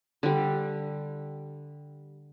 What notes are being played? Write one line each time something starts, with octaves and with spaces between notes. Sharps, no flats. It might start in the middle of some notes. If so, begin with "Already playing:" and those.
D3 G3